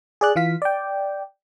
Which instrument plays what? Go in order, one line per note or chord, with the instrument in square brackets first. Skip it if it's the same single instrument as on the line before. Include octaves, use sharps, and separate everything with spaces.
[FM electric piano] G#4 D5 F#6
E3 F4 F5 B6
D5 G5